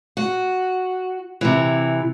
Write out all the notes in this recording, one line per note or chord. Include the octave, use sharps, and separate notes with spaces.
F#4
C3 E3